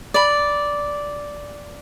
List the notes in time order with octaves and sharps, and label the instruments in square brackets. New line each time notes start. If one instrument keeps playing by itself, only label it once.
[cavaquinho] D5 B5